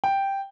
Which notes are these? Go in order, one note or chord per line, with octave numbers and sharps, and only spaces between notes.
G5